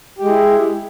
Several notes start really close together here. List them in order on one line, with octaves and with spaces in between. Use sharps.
G4 G#3 G#4 E4